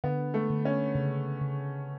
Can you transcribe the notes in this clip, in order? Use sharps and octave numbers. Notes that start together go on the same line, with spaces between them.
D3 B3
A3
D3
C#4
C#3
C#3